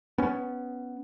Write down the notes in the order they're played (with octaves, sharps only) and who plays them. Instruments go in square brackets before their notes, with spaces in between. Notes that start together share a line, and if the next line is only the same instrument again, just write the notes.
[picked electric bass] B3 C#4